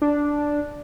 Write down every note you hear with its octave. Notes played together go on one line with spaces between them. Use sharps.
D4